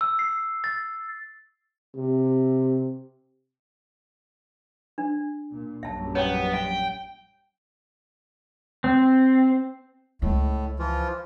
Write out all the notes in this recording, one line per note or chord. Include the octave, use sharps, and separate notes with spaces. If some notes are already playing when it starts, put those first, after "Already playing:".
E6
C7
A6
C3
D4
A#2
A#1 F#2 G3 E5 A5
B3 C#5 G5
E5 G5
C4
C#2 A2 G#3
E3 F3 F4